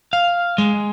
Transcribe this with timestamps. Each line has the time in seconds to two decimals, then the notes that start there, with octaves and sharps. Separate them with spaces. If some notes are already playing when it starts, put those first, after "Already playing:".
0.13 F5
0.58 G#3